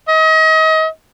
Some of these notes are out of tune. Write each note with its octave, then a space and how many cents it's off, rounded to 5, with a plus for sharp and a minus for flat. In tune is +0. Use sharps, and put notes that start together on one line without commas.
D#5 +35